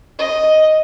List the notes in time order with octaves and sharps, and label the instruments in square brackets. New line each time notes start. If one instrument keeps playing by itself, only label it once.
[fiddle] D#5